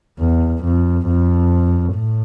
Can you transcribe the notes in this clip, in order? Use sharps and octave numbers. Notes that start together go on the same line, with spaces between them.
E2
F2
F2
A2